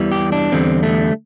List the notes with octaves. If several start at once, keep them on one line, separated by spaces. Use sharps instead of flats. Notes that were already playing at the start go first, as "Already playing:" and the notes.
Already playing: E2 E3 G3
G4
D4
E2 D3 G3 C4
A3